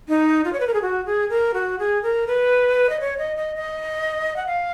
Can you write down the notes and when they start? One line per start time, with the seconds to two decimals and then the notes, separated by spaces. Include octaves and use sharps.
0.09 D#4
0.45 F4
0.53 C#5
0.60 B4
0.67 A#4
0.74 G#4
0.82 F#4
1.06 G#4
1.30 A#4
1.54 F#4
1.79 G#4
2.03 A#4
2.27 B4
2.90 D#5
3.00 C#5
3.18 D#5
3.37 D#5
3.56 D#5
4.36 F#5
4.47 F5